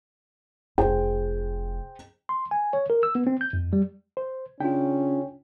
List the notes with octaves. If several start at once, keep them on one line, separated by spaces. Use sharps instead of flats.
F1 F4 G#4 C5 G5
C6
G#5
C#5
A#4
E6
B3
C4
G6
F2
G3
C5
C#3 C#4 D4 F4 G5